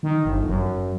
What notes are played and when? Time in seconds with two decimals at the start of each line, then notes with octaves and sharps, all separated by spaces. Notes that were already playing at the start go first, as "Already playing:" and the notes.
0.03 D#3
0.26 G1
0.47 F#2